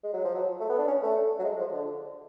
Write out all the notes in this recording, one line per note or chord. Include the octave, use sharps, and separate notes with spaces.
G#3
F#3
F3
F#3
A3
B3
D4
C#4
A3
F#3
G#3
F3
D3